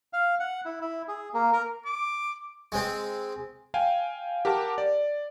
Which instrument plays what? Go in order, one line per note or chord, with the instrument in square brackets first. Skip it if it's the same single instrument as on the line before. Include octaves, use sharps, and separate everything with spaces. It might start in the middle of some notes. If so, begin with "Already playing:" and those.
[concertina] F5
F#5
E4
E4
G#4
A#3
A#4
[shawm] D6
[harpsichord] G#3 C4
[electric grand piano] F5 G5 G#5
G4 A#4 F#5 A5 D6
D5